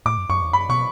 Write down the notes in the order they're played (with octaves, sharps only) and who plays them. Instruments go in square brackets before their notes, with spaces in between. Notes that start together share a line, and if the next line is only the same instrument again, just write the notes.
[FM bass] A2 [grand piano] D6
[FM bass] F#2
[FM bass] F#2 [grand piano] C#6
[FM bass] E2
[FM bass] F#2 [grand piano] B5
[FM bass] B2 [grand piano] C#6